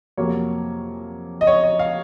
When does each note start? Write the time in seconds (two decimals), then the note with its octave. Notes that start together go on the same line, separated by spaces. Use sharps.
0.17 F2 C3 F#3 A#3 C#5
1.41 D#5
1.47 C#5
1.63 D#5
1.79 F5